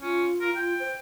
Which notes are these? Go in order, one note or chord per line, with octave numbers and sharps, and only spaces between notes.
C#4 F4
A#4
F4 G5
C5